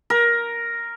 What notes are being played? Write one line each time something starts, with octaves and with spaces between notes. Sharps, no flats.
A#4